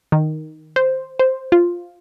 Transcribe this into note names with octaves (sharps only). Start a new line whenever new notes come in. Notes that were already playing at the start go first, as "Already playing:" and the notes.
D#3
C5
C5
F4